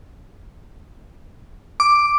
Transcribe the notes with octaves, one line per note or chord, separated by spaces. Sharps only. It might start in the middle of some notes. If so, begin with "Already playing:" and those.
D6